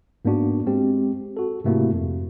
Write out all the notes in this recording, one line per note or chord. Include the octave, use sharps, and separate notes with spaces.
G#2 A#3 B3 D4 F#4
G#3 C4 G4
F#4 A4
G#2 C3 A3 A#3 E4 F#4
F2